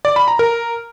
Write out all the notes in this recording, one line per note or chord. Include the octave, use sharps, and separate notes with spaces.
D5
B5
A#5
A#4